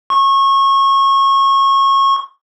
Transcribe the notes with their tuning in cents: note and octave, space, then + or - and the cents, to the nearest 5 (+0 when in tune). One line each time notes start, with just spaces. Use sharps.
C#6 -25